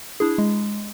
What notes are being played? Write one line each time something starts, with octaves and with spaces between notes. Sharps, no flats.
D4 E4 G#4
G#3